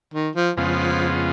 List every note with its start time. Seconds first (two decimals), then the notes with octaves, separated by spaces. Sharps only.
0.14 D#3
0.35 F3
0.56 F2 C#3 F3 G#3 B3 F4